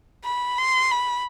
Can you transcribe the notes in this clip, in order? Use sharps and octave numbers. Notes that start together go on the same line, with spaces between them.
B5
C6
B5